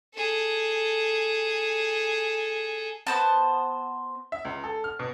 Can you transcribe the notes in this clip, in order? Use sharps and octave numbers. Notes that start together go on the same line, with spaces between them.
G#4 A4
B3 C5 A5
E5
C#2
A4
F6
B2